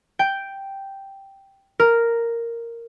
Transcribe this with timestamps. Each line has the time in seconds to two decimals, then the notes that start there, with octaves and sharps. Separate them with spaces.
0.19 G5
1.79 A#4